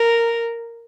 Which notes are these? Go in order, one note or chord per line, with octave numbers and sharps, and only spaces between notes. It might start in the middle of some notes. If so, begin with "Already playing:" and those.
Already playing: A#4